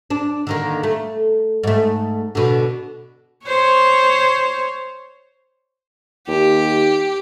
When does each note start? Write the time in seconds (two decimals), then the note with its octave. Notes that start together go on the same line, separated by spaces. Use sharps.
0.10 D4
0.47 D3 D#3 A#3
0.83 A3
1.63 G#2 A3
2.35 B2 D3
3.46 C5 C#5
6.28 D#2 G4